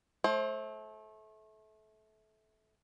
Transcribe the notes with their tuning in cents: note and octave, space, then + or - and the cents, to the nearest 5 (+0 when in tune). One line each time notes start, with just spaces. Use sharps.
A3 -25 C5 +30